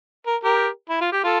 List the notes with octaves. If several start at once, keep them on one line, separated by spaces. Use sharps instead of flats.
A#4
G4 A#4
E4
F4
G4
F4 A4